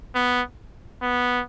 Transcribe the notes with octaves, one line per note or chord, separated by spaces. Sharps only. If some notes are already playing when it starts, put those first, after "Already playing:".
B3
B3